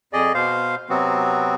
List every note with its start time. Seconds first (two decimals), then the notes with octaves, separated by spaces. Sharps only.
0.13 F2 G#4 D5 D#5
0.34 B2 C5 F5
0.89 C3 F#3 B3 C4 F#4